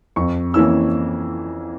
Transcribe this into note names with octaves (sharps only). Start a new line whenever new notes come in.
F2 C#6
E3 A#3 C#4 E4 E6